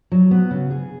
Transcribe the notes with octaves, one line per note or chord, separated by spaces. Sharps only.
F#3
B3
C#3
G#4